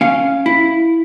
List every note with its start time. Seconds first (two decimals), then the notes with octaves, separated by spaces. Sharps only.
0.01 C#4 F5
0.46 E4